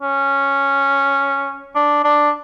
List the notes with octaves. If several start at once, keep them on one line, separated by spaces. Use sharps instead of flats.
C#4
D4
D4